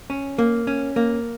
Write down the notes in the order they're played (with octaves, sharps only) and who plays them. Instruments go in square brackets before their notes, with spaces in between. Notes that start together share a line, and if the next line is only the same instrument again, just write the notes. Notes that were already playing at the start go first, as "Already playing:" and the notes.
[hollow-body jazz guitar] C#4
A#3
C#4
A#3